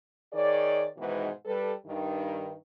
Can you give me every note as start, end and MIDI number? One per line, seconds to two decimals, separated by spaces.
0.33 0.87 51
0.33 0.87 68
0.33 0.87 73
0.33 0.87 74
0.98 1.29 44
0.98 1.29 47
0.98 1.29 51
0.98 1.29 52
0.98 1.29 56
0.98 1.29 59
1.45 1.72 55
1.45 1.72 69
1.45 1.72 71
1.85 2.52 43
1.85 2.52 51